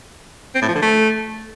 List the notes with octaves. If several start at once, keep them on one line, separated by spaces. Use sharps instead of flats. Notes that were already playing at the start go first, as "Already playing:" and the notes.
C4
A2
F3
D3
A3